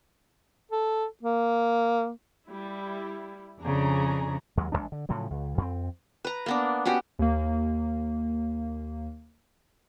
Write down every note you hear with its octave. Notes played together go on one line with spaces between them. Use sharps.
A4
A#3
G3 E4
F2 C#3 D4 G#4 A#5
D#2 F#3 G#3
A1 F3 G#3 D4
D3
A2 C#3 F3 F#3
C#2
F2 G#3 C4
B4 A#5
A#3 B3 D4
B3 C#4 F#4 G4
D#2 A#3